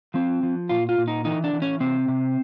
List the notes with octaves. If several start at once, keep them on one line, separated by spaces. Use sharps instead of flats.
F3 C4
F3
A#2 F4
F4
A#2
D#4
E3 D#4
D4
E3
C#4
C3 C4
C3